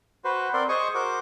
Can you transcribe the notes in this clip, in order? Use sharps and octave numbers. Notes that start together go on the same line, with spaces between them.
F#4 B4 C5
C4 A#4 D5 C6
G#4 C5 D#5 G#5 C#6
F#4 A#4 C5 D6